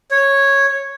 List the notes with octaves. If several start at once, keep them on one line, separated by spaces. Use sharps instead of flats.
C#5